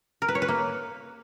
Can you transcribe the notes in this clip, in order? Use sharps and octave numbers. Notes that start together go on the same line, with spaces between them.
A#4
B4
C#5
B4
A#3